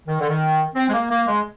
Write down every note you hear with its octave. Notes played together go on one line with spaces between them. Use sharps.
D#3
D3
D#3
C4
G#3
A#3
A#3
G#3